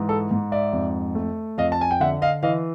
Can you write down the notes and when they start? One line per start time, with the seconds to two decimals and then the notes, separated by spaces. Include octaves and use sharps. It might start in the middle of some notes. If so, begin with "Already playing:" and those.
Already playing: G#2 E3
0.09 A4
0.31 G#2
0.52 D5 E5
0.73 F2
1.15 A3
1.58 F2 D#5 F5
1.72 A5
1.81 G#5
1.91 G5
2.00 D3 E5 F#5
2.22 D#5 F5
2.43 E3 D#5 F5